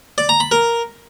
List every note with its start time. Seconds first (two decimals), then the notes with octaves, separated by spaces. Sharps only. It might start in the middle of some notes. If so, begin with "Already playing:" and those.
0.18 D5
0.29 A#5
0.40 B5
0.52 A#4